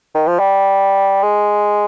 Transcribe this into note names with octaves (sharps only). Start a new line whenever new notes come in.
D#3
F3
G3
G#3